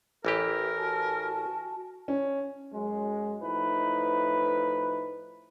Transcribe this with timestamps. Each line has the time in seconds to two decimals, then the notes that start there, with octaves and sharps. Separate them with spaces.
0.25 A1 E3 G4 A#4
0.79 F#4 G#5 A5
2.08 C#4
2.73 F#2 F#3 G#3
3.42 A2 F3 D#4 E4 B4